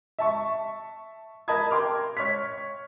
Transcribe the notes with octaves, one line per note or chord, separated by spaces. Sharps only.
E5 A5 C#6
A#4 D#5 A5 B5 D#6 G#6
A#4 G5 C6 D6 F6
C#5 F6 B6